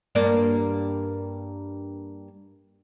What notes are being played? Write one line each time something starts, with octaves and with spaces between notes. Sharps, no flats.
G2 A#3 D5